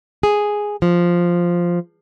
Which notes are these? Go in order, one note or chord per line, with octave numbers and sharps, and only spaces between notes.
G#4
F3